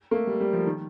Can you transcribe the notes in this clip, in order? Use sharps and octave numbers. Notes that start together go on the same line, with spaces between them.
A#3
A3
G3
G3
F3
D#3